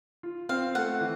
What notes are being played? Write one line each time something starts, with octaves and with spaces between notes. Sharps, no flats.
F4
C4 F5
A3 F#5
E3